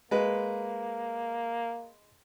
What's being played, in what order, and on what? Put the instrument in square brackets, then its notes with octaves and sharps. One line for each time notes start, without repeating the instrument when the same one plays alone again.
[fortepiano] G#3 B4 [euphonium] A#3